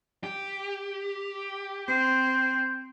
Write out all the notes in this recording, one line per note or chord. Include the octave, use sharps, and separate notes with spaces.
G4
C4 G6